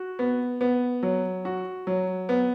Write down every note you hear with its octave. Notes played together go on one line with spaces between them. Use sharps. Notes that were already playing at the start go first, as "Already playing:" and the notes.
Already playing: F#4
B3
B3
F#3
F#4
F#3
B3